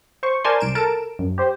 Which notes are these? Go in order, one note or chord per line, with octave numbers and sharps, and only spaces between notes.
C5 C#6
A#4 C5 D5 G#5 A5 C6
C2 D7 E7
A4 A#4 A5 D7 E7
F#2
G4 C5